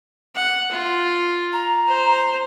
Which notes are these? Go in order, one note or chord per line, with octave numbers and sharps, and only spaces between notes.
F#5
F4
A#5
C5